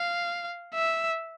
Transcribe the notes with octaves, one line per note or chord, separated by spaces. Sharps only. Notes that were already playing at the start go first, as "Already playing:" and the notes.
Already playing: F5
E5